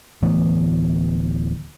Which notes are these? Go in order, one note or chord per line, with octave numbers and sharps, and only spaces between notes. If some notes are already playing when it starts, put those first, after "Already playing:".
D1 E3 A3 B3